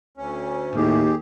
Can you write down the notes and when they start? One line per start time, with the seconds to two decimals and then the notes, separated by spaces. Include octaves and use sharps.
0.17 D2 C#4
0.76 D#2 A2 G4 G#4